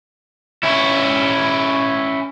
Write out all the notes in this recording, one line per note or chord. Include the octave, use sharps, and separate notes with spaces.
C#4 E4